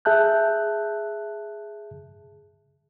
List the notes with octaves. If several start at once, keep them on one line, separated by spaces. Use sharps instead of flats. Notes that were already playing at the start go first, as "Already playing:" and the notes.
G#4 E5 A5 F#6 G6